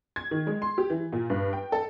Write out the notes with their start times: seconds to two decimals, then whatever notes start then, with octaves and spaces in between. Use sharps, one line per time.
0.16 G#6
0.31 D#3
0.47 G#3
0.62 C6
0.78 G4
0.90 E3
1.13 A#2
1.30 G2
1.53 G5
1.72 A4